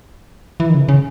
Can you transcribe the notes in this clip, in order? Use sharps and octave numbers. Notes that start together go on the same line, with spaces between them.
E3
D#3
C#3
C#3